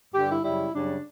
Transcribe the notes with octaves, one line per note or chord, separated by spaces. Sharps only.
G2 D3 G3 G4
E4
F#2 C#3 G3 E4
F#2 C#3 G3 D4